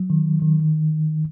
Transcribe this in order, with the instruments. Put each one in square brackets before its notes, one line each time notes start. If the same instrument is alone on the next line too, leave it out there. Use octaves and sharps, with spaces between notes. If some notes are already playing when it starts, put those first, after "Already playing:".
Already playing: [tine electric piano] F#3
D#3
D#3